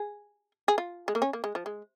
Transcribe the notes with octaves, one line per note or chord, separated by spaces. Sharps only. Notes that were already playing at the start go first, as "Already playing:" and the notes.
Already playing: G#4
G#4
F4
G#3
A#3
C#4
A#3
G#3
F3
G#3